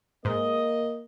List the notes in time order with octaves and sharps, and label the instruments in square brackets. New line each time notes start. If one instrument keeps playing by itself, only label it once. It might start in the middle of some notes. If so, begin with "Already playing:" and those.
[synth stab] G#2 [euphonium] A#3 [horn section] D#5